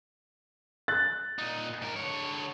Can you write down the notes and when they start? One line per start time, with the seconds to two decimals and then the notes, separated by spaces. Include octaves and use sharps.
0.88 F#6 A6
1.38 A#2 D#4
1.82 G#2 A#4
1.96 D3 C#5